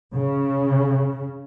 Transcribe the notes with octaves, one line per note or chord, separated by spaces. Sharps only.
C#3